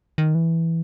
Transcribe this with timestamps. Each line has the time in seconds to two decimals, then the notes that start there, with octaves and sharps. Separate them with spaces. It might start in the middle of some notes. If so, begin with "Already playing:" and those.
0.18 D#3
0.35 E3